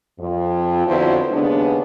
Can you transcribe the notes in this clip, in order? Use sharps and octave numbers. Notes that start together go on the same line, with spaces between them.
F2
F2 D3 F#3 B3 E4 C5
D#2 C#3 G#3 B3 D4